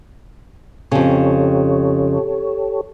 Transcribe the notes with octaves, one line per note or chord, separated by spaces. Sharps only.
F2 C#3 G4 A4 C#5